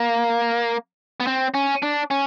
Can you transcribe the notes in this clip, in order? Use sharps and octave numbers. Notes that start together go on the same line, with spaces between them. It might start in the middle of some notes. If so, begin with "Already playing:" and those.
Already playing: A#3
B3
C4
C#4
D4
C#4